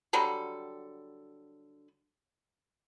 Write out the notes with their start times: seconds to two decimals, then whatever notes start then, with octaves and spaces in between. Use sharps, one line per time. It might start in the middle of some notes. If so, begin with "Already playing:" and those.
0.13 D3 F#3 G3 A4